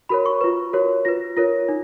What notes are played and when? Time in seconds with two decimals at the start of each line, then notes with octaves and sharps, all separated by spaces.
0.09 F#4 A#4 C#5 B5
0.26 C#6
0.41 F4 B4
0.73 F#4 A#4 C#5
1.05 F4 B4 A#6
1.37 F4 A#4 C#5 A#6
1.69 D#4